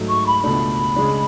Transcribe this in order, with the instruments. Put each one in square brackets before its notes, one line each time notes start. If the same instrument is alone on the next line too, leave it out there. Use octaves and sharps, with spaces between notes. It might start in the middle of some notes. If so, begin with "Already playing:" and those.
Already playing: [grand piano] G#2 F#3 A3
[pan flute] C#6
B5
[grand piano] C#2 B2 A3 D4 [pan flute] B5
[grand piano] C#3 G#3 D4